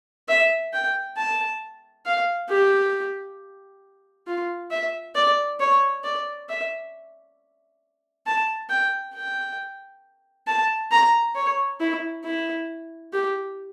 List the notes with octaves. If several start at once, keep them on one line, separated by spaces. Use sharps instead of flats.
E5
G5
A5
F5
G4
F4
E5
D5
C#5
D5
E5
A5
G5
G5
A5
A#5
C#5
E4
E4
G4